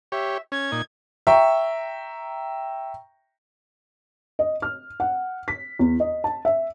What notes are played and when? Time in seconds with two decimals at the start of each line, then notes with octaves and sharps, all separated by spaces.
0.12 G4 C#5 E5
0.52 C#4 G#6
0.72 A#2 D#4
1.27 E5 G5 A#5 C#6
4.39 D#5
4.62 F6
5.00 F#5
5.48 B6
5.79 E2
6.00 D#5
6.24 A5
6.45 E5